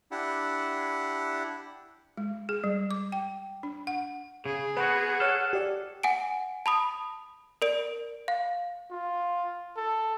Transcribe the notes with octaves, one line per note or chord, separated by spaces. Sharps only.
D4 E4 G4 F#5
G#3
G#4
G3
D6
G5
D4
F#5
C#3 G#4
B3 C4 F#4 B4 F#5
A4 C#5 F6
G4 D5
F#5 G#5 D7
A5 B5 D#6
A#4 D5 D7
F5
F4
A4